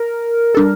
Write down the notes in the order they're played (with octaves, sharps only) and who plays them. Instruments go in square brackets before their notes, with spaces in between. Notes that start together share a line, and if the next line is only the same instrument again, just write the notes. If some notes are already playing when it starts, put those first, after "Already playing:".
Already playing: [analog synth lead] A#4
[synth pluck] G3 D4 A4